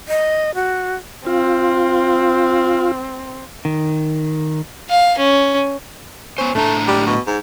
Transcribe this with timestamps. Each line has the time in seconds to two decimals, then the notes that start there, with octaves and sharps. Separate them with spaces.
0.08 D#5
0.55 F#4
1.26 C4 F4
3.65 D#3
4.89 F5
5.18 C#4
6.38 B3 C#4 C5
6.55 A2 A3 D4 A#5
6.88 G3
7.07 B2
7.27 G#2